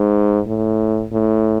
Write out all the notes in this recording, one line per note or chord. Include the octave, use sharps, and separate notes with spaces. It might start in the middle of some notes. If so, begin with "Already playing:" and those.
Already playing: G#2
A2
A2